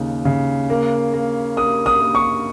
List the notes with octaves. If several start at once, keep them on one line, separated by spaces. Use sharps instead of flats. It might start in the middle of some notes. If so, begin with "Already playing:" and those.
Already playing: D#2 C#3 D#4
C#3
A#3
A#3
A#3 D#6
D#6
A#3
C#6